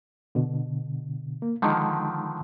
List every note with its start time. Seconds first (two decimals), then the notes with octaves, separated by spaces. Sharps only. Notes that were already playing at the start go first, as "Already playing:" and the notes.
0.35 B2 D3
1.42 A#3
1.62 D3 D#3 F3 G#3 D#4